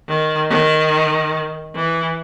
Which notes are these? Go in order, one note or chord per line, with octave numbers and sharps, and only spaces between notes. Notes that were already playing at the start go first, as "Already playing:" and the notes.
D#3
D#3
E3